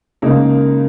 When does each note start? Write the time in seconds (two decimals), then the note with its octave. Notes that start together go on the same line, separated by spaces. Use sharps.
0.22 C#3 G#3 A#3 D#4 A#4